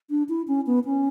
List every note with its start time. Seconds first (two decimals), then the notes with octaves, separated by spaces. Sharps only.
0.10 D4
0.29 E4
0.48 C#4
0.66 B3
0.85 C#4